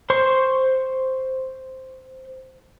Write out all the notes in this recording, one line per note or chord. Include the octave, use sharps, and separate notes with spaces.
C5 C6 C#6